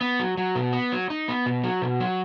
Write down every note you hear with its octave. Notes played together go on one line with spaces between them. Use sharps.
B3
F#3
F#3
B2
B3
F#3
D#4
B3
B2
F#3
B2
F#3